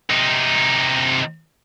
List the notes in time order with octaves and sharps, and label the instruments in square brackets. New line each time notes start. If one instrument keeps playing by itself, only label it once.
[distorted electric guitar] C3 D#4